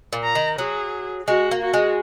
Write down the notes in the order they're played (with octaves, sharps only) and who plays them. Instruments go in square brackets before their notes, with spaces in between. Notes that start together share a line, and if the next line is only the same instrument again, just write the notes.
[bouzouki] A#2
[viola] A#5
[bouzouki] D#3
[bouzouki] F#3 [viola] G#4
[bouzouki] G#3 [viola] F#4
[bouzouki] A#3
[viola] F#4
[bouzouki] G#3